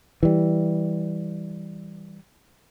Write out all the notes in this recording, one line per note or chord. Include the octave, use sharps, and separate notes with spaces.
E3 G3